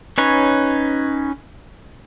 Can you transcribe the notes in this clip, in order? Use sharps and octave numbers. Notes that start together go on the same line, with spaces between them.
C#4 D#4 B4 C#5